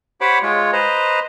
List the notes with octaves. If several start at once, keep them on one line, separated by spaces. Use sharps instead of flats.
G4 C5 C#5 F#5 B5 D6
G#3 F4 C#5
B4 C5 D#5 A#5